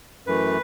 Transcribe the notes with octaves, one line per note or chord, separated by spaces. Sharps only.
F#2 E3 A3 B4